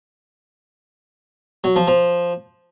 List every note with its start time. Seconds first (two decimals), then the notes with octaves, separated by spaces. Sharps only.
1.64 F#3
1.76 F3
1.88 F3